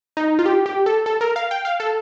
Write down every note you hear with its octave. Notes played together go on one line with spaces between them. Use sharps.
D#4
F4
G4
G4
A4
A4
A#4
F5
G5
F5
A4